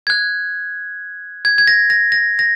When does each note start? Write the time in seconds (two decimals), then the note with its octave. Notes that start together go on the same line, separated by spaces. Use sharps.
0.07 G#6
0.10 F#6
1.45 G#6
1.58 G#6
1.68 A#6
1.90 A#6
2.12 A#6
2.39 A#6